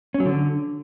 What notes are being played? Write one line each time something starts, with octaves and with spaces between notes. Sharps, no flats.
C#4
F#3
D3